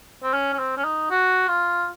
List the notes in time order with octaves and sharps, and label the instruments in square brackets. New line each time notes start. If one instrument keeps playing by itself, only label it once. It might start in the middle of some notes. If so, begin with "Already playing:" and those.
[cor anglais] C4
C#4
C#4
C4
C#4
D#4
F#4
F4